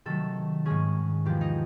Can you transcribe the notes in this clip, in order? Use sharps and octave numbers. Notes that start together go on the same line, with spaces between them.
C3 D#3 F#3 A3 A4
G#2 D#3 G#3 C#4 G#4
E2 C3 F3 G4
D#4